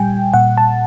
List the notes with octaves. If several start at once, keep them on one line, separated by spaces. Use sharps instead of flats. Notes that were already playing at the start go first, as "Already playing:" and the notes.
Already playing: A#2 G3 G5 G#5
A#2 F#5
A5